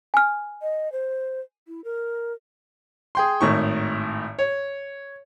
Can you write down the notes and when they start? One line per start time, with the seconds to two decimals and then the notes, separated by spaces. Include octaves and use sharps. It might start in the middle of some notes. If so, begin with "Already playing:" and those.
0.14 G#5 F6
0.62 D#5
0.92 C5
1.68 E4
1.84 A#4
3.15 G#4 G5 C6
3.41 G#1 A2 D#3 C#6
4.39 C#5